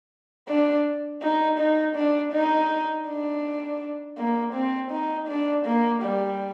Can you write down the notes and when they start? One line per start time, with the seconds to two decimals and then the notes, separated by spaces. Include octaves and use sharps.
0.49 D4
1.22 D#4
1.59 D#4
1.96 D4
2.33 D#4
3.07 D4
4.18 A#3
4.54 C4
4.91 D#4
5.28 D4
5.66 A#3
6.02 G3